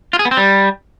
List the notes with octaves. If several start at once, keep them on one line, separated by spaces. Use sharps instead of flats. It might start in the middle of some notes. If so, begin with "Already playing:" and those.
F4
G#4
B3
C4
G3